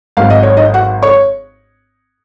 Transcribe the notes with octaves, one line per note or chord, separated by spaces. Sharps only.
G#1 G#2 F#3 F5
D#5
C#5
D#4 D#5
F#4 F#5
C#5 C#6